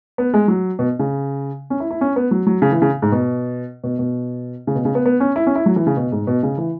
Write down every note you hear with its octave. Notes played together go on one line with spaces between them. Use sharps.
B3
G#3
F#3
B2
C#3
C#4
E4
E4
C#4
B3
F#3
F#3
C#3
E3
C#3
G#2
B2
B2
B2
C#3
B2
C#3
B3
B3
C#4
E4
C#4
E4
F#3
E3
C#3
B2
G#2
B2
C#3
E3